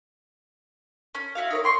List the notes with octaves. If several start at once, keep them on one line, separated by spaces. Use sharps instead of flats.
C#4
E4 F#4 F5
D#4 A#4 C#5
G5 C6 C#6